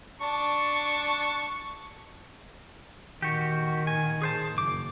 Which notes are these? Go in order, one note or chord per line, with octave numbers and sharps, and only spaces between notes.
D4 A5 C#6
A#2 D#3 F#4 G4
G#5
G#4 C5 A5
F#1 D6